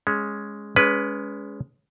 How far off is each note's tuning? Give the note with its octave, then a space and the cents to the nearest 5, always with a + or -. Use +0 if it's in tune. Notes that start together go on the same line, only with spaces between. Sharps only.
G#3 +0 C#4 +0
G#3 +0 C#4 +25 B4 +0